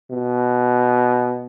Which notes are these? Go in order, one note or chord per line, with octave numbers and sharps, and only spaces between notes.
B2